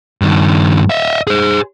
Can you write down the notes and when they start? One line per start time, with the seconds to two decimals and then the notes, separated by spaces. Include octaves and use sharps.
0.22 G2 D#3
0.90 D#5 E5
1.27 G#4 C5